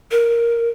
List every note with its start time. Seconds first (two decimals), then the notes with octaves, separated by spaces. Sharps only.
0.11 A#4